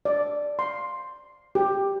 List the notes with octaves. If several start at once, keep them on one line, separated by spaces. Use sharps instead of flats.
D5
C6
G4